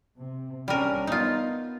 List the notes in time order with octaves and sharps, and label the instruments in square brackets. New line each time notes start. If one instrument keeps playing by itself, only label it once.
[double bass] C3
[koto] G3 A#4 [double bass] C#4 D4
[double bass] B3 [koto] D#4 F4